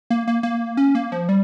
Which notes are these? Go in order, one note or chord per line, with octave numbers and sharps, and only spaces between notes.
A#3
A#3
A#3
C#4
A#3
F3
G3